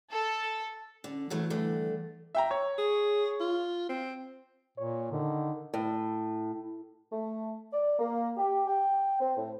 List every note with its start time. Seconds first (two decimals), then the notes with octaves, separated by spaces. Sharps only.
0.12 A4
1.04 D3 C#4
1.30 A2 E3 F#3 A3
1.50 G2 D3 A3
2.35 E5 G5 A#5
2.51 C#5
2.78 G#4
3.40 F4
3.89 C4
4.78 A#2 C#5
5.12 D3 D#3
5.74 A2
7.11 A3
7.72 D5
7.99 A#3
8.36 G4
8.67 G5
9.19 C4
9.35 A2